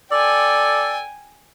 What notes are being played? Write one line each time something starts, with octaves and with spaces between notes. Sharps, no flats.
A4 D5 G5 G#5